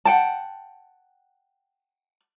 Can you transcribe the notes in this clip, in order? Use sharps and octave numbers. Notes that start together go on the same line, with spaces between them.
F#5 G5 A5